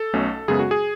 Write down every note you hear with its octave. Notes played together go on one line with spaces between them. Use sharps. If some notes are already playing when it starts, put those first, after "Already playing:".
Already playing: A4
B1 B2 A3 C#4
F#2 C#3 G#3 B3 G#4
F#4
G#4